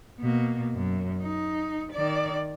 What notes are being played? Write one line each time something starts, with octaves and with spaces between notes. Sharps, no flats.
B2 A#3
F#2
D#4
D#3 D5